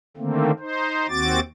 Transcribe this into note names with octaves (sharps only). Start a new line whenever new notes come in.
D3 D#3 A3 A#3 C4
D#4 C5
D#2 C4 F#4 D6 A6